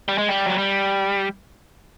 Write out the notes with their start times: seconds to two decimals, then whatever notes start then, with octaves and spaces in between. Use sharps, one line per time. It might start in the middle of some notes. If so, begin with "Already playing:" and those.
0.08 G3
0.18 G#3
0.29 G3
0.46 F#3
0.58 G3